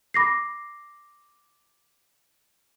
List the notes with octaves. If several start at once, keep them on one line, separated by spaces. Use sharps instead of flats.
B5 D6 A#6 C7